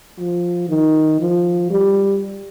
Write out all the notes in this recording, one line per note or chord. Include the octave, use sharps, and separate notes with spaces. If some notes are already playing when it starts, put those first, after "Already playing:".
F3
D#3
F3
G3